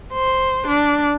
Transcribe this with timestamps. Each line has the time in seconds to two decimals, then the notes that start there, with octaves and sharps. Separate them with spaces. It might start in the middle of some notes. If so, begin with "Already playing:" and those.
0.13 C5
0.67 D4